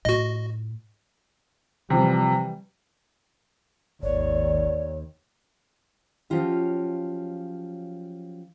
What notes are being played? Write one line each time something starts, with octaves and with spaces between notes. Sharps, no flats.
A2 F4 F#4 D#5
C3 E3 F3 G3
G#1 D#2 C#5 D5
F3 F#3 C#4 F4 G4